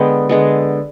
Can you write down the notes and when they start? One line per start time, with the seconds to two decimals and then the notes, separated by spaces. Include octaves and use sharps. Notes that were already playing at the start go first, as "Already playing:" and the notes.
Already playing: D3 G#3 B3 G5 B5
0.29 D3 G#3 B3